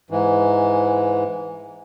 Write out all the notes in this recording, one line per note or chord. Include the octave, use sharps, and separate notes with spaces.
G#2 E3